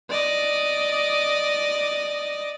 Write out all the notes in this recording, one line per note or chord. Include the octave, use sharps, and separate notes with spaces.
D5 D#5